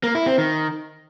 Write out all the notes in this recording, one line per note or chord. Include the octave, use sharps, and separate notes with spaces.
A#3
E4
C4
D#3